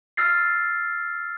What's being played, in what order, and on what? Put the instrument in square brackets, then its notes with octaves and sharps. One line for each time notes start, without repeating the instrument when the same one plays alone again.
[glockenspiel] E6 F6 A6 C7